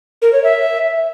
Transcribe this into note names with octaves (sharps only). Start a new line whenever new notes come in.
A#4
C#5
E5